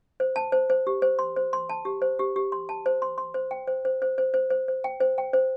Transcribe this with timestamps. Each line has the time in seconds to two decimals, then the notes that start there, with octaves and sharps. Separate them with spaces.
0.20 C5
0.36 A5
0.52 C5
0.70 C5
0.87 G4
1.02 C5
1.19 C6
1.36 C5
1.53 C6
1.69 A5
1.85 G4
2.02 C5
2.19 G4
2.36 G4
2.52 C6
2.69 A5
2.86 C5
3.02 C6
3.18 C6
3.34 C5
3.51 G5
3.67 C5
3.85 C5
4.02 C5
4.18 C5
4.34 C5
4.50 C5
4.68 C5
4.84 G5
5.00 C5
5.18 G5
5.33 C5